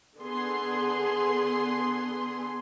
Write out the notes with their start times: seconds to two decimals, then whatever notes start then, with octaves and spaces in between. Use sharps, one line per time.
0.18 D3 B3 G#4 C6